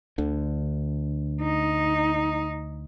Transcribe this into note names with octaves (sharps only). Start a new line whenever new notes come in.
D2 D3
D#4